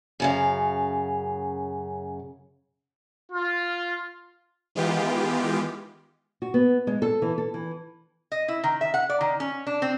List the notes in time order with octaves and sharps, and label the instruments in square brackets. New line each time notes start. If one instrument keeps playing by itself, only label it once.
[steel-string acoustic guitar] F#2 C#3 F5
[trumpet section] F4
[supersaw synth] D#3 E3 G#3 B3 F4 G4
[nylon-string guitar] F#4
B3
G#3
A4
E3
A4
E3
[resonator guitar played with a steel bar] D#5
E4
D#3
E5
F#5
D5
D#3
C#4
D4
C4